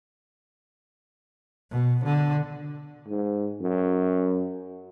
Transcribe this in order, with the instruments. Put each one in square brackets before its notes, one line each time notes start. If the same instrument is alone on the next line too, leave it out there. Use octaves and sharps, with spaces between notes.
[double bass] B2
D3
[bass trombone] G#2
F#2